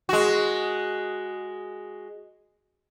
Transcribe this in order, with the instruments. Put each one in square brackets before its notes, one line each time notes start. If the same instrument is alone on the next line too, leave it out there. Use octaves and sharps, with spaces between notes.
[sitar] G#3 F#4